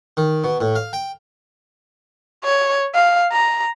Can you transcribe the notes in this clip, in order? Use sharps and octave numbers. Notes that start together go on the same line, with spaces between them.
D#3
B2
A2
F5
G5
C#5
F5
A#5